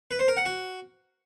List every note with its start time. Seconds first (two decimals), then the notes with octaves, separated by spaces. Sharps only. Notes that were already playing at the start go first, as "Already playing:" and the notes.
0.11 B4
0.19 C5
0.28 A#4
0.37 F#5
0.45 F#4